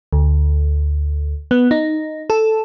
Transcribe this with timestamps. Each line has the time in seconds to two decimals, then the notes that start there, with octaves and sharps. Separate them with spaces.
0.13 D2
1.51 B3
1.71 D#4
2.30 A4